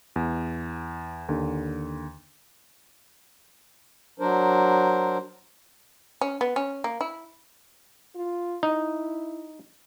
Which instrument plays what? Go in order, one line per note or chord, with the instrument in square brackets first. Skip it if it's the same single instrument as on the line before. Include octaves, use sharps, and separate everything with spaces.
[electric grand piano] E2
D#2 D3
[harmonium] F#3 D4 A#4 C5
[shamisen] C#4
B3
C#4
A#3
E4
[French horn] F4
[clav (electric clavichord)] D#4 [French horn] E4